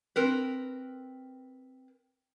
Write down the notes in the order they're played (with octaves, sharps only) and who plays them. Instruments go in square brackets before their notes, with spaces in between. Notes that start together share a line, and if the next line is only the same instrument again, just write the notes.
[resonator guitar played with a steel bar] C4 A#4 B4